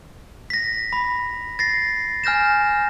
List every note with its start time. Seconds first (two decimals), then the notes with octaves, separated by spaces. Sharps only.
0.50 A#6 B6
0.93 B5
1.59 A6 A#6 C7
2.24 G#5 F6 G6 A#6 E7